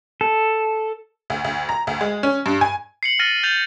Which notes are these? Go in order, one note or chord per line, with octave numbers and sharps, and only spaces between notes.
A4
D2
D2
A#5
D2
G#3
C#4
G2
G#5
C7 C#7 F#7
F6 A6 A#6 D#7
G6 A6 C7 F7